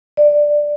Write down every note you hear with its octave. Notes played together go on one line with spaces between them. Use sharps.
D5